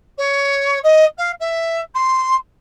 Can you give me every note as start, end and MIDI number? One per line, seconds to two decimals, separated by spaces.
0.18 0.79 73
0.83 1.04 75
1.17 1.31 77
1.40 1.80 76
1.94 2.35 84